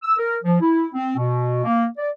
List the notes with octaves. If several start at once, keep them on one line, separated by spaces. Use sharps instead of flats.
E6
A#4
F3
E4
C4
B2
A#3
D5